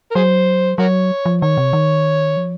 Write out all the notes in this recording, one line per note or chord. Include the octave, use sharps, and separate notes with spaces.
A#4
F#3 G#4 C5
F#3 F#4 A#4 C#5
F3
D#3 C#5
C3
D#3
F3